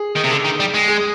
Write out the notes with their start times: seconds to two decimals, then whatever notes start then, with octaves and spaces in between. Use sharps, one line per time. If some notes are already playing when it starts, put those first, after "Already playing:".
Already playing: G#4
0.16 D#3
0.24 C3
0.30 D3
0.44 D#3
0.60 G3
0.74 G#3
0.88 G#4